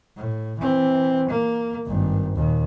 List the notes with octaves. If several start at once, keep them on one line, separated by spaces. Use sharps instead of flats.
A2
E3 C4
A#3
G#1 G2
D#2 A#2